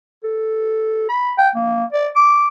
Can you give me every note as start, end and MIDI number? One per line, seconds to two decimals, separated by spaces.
0.24 1.07 69
1.09 1.33 83
1.38 1.49 79
1.55 1.84 58
1.93 2.08 74
2.16 2.48 86